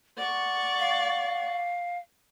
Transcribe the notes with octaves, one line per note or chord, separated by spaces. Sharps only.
D5 F#5 C#6
F5